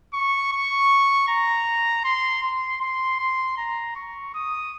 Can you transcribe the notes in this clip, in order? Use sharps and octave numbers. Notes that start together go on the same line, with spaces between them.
C#6
C#6
A#5
C6
C6
C6
C6
A#5
C#6
D#6